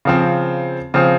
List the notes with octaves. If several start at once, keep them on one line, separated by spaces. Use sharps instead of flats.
C#3 F3 C4
C#3 F3 C4